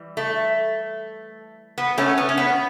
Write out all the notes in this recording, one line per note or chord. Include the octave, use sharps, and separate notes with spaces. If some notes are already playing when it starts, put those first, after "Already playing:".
Already playing: E3 G3
A3
B3
A3 C#4
B3
C#4
B3